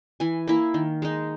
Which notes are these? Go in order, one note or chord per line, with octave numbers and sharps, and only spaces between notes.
E3 G#5
A#3 E4
D#3
G#3 D#4